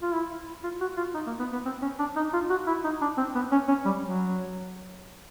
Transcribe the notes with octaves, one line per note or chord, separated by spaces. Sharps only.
F4
E4
F4
F#4
F4
D#4
A#3
B3
B3
C4
C#4
D4
D#4
F4
F#4
E4
D#4
D4
C4
B3
C#4
C#4
G3
F#3